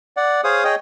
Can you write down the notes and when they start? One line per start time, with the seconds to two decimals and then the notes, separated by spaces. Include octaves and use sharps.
0.17 D5 F#5
0.44 G#4 C5 C#5 F5 D#6
0.65 G#4 C#5 D#5 G5